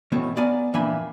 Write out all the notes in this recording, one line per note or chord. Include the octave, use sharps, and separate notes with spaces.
B2 E3 A3 C4 C#4
B3 D5 F5 G#5 A#5
F2 A#2 E3 D4 G#5 B5